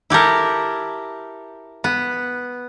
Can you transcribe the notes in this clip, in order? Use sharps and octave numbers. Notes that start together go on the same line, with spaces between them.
E4 G4 A4 A#4
B3